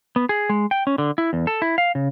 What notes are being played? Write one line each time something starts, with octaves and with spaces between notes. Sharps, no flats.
B3
G#4
G#3
G5
C#4
D3
E4
E2
A4
E4
F5
C#3